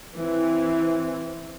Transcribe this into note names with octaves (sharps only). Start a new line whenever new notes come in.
E3 C4